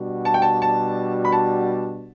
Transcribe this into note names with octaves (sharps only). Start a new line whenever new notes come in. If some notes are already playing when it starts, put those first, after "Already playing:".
Already playing: B2 G3 D4 F#4
A5
G5
A5
A5
B5
A5